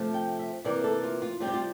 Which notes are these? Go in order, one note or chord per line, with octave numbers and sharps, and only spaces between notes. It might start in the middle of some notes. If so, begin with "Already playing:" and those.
Already playing: C3 F3 A3
G5
E5
C3 E3 A#3 D5
A4
F4
F4
C3 G3 C4 F4
G4
F4